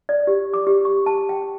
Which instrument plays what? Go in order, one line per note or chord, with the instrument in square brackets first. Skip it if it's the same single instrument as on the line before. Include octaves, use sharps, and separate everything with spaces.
[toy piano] D5
G4
D6
G4
C#6
A5
G5